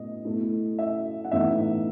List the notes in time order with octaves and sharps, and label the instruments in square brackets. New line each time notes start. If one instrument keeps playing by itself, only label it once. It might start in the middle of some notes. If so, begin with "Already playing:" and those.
Already playing: [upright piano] A2 B3 D#5
B2 A3 E4
E5
F#5
A2 E3 B3 D#4 E5